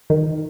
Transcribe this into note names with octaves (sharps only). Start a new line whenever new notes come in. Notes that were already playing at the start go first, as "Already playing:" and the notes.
D#3